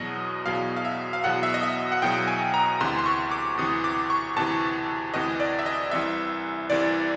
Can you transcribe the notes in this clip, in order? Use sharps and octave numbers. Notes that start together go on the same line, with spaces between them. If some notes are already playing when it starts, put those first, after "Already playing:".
Already playing: E2 B2 F#3 D#5
E2 B2 F#3 F5
F5
E5
F5
E2 B2 F#3 F#5
E5
D#5
E5
F#5
E2 B2 F#3 G5
G#5
A#5
D2 C3 E3 C6
C6
C#6
D6
D2 C3 E3 D#6
D6
C#6
D2 C3 E3 A5
D2 C3 E3 D#5
D5
E5
D#5
C2 C3 E3 E5
C2 C3 E3 D5